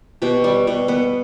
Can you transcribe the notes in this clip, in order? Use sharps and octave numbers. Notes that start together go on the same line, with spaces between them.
B2 G4
G3
B2
B3